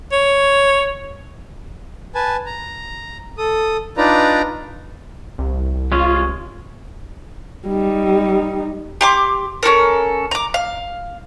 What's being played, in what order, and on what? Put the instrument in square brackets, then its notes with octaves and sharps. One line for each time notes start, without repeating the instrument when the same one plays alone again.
[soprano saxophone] C#5
[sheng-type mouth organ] B4 G#5 A5
A#5
A4 D#6
D4 D#4 F4 B4 D5 A#5
[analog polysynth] C2
[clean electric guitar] G#3 C#4 [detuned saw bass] F4
[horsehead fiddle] G3 D#4
[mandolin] G4 C6 D6
C#4 F#4 A4 A#4
A#5 D6
F5